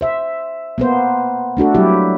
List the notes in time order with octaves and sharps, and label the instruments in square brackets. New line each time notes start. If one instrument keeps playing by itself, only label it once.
[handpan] C5 E5
A#3 B3 C5
A3 D4 F#4 A4
F#3 G3 A#3 E4 G4